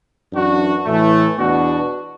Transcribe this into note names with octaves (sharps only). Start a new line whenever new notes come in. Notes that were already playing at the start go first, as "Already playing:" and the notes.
F#2 E3 D4 F#4
A2 E3 A3
E2 B2 B3 D4 F#4